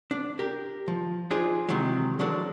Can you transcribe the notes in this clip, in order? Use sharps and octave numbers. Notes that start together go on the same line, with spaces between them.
D4
G4 A#4
F3
D4 D#4 F4 G#4 C5
C3 D#3 E3 F#3 G#3
F3 F#3 G#3 D4 A4 A#4